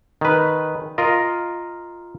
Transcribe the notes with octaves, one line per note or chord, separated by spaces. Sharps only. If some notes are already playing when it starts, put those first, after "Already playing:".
D#3 B4
F4 A#4 D#5